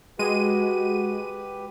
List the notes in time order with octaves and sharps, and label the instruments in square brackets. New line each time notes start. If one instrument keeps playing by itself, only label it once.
[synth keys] G#3 D#7 [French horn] F#4 [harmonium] G4 B4